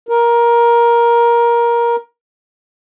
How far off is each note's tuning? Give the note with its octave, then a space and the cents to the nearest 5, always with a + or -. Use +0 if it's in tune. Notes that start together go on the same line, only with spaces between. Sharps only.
A#4 +15